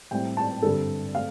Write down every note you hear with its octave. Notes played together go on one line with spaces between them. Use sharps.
A2 G3 C4 G5
A5
G2 D3 G3 C4 A4
A3 C4 F5